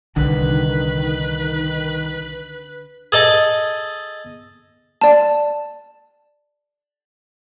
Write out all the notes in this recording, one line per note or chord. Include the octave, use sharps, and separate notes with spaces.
C2 D3 D#3 B4
G#4 A4 D#5 A5
D5 A5